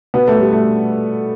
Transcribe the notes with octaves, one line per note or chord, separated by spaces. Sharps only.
B2 B3
A3
G3
A3